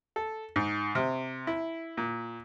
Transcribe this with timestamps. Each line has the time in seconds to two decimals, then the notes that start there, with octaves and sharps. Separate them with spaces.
0.16 A4
0.56 G#2
0.95 C3
1.47 E4
1.97 A#2